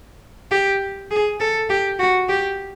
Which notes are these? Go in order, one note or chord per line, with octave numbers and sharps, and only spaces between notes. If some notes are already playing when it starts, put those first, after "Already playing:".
G4
G#4
A4
G4
F#4
G4